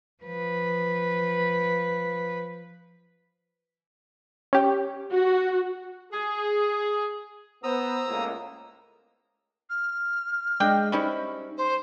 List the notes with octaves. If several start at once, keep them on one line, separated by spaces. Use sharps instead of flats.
F3 B4
C#4 G4
F#4
G#4
B3 C5 A#5 D#6 E6
C#2 A2 A#3
F6
G#3 D4 G#4 D#5 G5
G3 C#4 D#4 E4 C5 D#5
C5